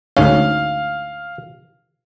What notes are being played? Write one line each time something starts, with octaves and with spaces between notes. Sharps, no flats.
D2 G#2 C#4 F5